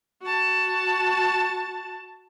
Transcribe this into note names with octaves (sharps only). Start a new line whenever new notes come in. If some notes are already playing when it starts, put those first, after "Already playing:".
F#4 A5